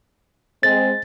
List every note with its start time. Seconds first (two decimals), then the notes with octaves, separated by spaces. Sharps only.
0.63 G#3 C4 A6